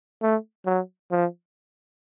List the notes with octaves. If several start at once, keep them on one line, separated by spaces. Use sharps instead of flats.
A3
F#3
F3